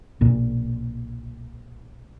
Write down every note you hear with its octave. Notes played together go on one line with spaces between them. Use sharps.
B1 A#2